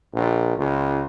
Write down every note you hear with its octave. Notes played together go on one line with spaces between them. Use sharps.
A#1
C#2